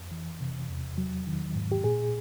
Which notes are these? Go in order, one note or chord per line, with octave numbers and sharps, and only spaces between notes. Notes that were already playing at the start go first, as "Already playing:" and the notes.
Already playing: F2
E3
C3
E2
F#3
D#3
G#2
G4
A#2 G#4